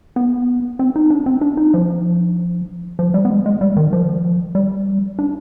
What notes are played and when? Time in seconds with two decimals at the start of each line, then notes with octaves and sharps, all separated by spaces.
0.16 B3
0.79 C4
0.96 D#4
1.10 D4
1.26 C4
1.41 D4
1.57 D#4
1.74 F3
2.99 F3
3.14 G3
3.25 B3
3.30 G#3
3.46 G#3
3.61 G3
3.76 D#3
3.93 F3
4.55 G3
5.19 D4